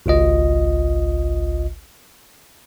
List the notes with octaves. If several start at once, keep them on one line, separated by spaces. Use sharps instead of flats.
G#1 C#2 F4 D#5